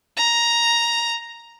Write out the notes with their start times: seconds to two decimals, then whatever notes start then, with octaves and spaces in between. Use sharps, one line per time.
0.17 A#5